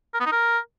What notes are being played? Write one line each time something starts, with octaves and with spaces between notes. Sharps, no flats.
A#4
B3
D#4
A#4